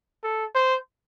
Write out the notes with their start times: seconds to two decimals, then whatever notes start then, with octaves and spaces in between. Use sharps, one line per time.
0.23 A4
0.55 C5